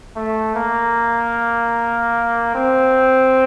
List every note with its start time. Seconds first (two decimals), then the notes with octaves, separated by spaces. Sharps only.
0.16 A3
0.55 A#3
2.55 C4